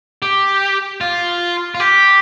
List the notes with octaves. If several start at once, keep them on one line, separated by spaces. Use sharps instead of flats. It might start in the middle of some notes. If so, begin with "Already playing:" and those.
G4
F4
F4
G4